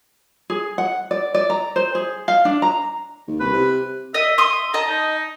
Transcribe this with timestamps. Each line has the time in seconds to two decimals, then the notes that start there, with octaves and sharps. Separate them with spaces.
0.50 G#4
0.78 F#5
1.11 D5
1.34 D5
1.50 A#5
1.76 C5
1.95 G#4
2.28 F5
2.45 D4
2.62 A#5
3.28 D#2
3.40 C2 B4
3.53 C3
4.14 D#5 E5
4.38 C6 D#6
4.73 D#5 A5 A#5
4.89 D#4